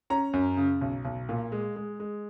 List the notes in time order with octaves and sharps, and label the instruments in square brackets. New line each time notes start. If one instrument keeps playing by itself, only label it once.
[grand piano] C#4 A#5
F#2
C#3
B1
B1
A#2
G#3
G#3
G#3